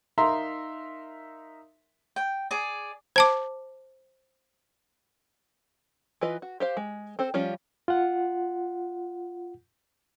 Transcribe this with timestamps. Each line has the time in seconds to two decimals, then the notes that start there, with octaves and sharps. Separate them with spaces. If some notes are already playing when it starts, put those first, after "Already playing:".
0.18 D#4 A#4 E5 F5 A#5 C6
2.16 G5
2.51 G#4 D5
3.16 C5 A5 D6
6.21 E3 F4 B4 D#5
6.42 F#4
6.60 G4 C5 F5
6.77 G#3
7.19 C4 A4 C5
7.34 F3 G3 C#4 F4
7.88 F4 F#5